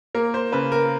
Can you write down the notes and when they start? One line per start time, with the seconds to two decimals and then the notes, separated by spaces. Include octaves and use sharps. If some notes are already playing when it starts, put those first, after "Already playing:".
0.14 A#3 A#4
0.34 C5
0.52 C#3 B4
0.72 A#4